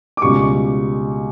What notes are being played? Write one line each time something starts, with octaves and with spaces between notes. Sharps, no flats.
D6
C#2 B2 G3 C#6